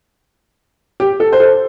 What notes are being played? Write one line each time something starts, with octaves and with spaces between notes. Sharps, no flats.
G4
A4
C5
A4